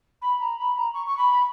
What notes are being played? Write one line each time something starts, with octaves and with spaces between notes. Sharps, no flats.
B5
A#5
B5
A#5
C#6
C#6
B5